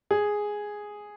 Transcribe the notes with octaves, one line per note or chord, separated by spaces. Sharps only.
G#4